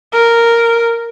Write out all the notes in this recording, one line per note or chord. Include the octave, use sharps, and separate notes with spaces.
A#4